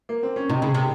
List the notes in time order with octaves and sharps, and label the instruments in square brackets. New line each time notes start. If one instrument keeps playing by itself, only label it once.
[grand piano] A#3
C4
C#4
[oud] C3 [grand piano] D#3 D#4
[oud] C#3
C3